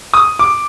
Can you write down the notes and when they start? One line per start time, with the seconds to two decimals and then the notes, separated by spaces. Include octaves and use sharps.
0.14 D#6
0.39 D6